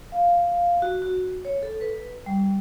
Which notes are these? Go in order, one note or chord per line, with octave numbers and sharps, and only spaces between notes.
F5
F#4
F#4
C#5
A4
B4
G3